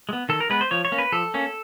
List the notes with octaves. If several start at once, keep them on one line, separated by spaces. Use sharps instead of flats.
G#3
B3
D#3 A4
A#4
G#3 B3 B4
C5
F3 C#5
C#5
A#3 C#4
B4
F3 A4
A#3 C#4